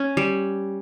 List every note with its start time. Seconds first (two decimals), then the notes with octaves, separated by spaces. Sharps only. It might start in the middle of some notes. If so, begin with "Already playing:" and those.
Already playing: C#4
0.17 G3